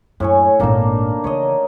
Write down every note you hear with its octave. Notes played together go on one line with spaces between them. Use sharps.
F#2 A2 C#5 G#5
G#1 A#2 D#3 A#3 D4
C#3 E3 C#5 D#5